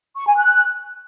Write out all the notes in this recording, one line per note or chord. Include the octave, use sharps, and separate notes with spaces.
C#6
G#5
F#6